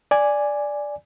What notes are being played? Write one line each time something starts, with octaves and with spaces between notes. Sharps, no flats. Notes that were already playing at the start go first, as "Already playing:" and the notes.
D5 G#5